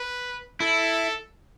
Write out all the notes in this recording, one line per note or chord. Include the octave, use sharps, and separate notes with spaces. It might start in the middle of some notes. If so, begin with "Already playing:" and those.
Already playing: B4
E4 A4